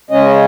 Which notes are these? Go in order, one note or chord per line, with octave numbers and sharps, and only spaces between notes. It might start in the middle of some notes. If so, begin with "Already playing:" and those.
C#3 G#3 C#4 D#5